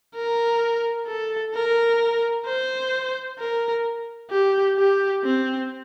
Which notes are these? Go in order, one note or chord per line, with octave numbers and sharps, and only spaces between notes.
A#4
A4
A#4
C5
A#4
G4
G4
C4